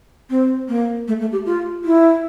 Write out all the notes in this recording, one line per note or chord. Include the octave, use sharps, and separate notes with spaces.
C4
A#3
A3
A3
G4
F4
E4